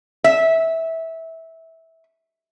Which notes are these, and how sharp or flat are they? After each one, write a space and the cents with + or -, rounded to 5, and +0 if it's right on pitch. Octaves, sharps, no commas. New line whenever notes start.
E5 -15